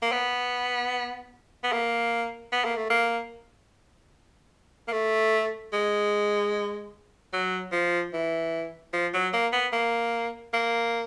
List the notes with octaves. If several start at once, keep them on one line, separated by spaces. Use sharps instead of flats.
A#3
B3
B3
A#3
B3
A#3
A3
A#3
A#3
A3
G#3
F#3
F3
E3
F3
F#3
A#3
B3
A#3
A#3